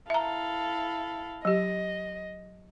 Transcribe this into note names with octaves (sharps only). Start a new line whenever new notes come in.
E4 A4 E5 F5 A#5
F#3 G4 D#5